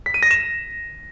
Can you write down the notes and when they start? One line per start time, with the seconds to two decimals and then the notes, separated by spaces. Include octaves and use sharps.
0.06 B6
0.14 D#7
0.23 A#6
0.31 E7